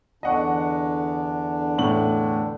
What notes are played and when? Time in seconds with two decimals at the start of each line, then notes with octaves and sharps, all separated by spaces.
0.23 E2 D3 D4 D#5 F#5 C#6
1.78 A2 F#7